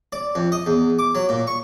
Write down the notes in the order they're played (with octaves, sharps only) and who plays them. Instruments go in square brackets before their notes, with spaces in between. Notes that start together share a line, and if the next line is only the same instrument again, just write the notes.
[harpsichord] D5
F2
D#5
E2
D6
F#3
A#2
C#6